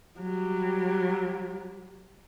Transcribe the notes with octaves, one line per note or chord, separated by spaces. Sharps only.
F#3 G3